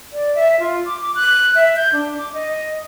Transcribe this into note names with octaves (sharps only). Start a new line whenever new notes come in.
D5
E5
F4
D6
D6
F#6
E5
G6
D4
D6
D#5